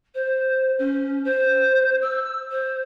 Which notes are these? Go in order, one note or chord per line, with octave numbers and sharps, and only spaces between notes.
C5
C#4
C5
E6
C5